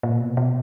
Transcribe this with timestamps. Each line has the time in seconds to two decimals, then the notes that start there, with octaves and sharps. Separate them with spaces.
0.03 A#2
0.20 B2
0.37 B2